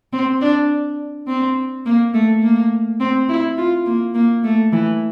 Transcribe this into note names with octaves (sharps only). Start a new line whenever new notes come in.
C4
D4
C4
A#3
A3
A#3
C4
E4
F4
A#3
A#3
A3
E3